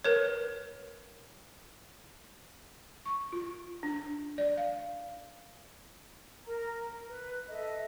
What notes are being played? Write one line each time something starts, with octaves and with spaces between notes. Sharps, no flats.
A#4 B4 C#5
C#6
F4
D4
D5
F5
A#4 A#5
B4
A4 D#5 E5